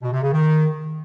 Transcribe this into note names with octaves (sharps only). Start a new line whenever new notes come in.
B2
C3
C#3
D#3